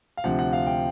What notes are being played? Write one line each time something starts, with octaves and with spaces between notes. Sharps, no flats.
F5
D2 C3 F3 F#5
F#5
F5
G5